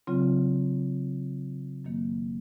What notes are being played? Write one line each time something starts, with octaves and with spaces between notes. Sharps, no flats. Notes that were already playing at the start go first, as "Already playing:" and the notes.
C#3 F#3 C4 F4
F#2 D#3 F#3 A#3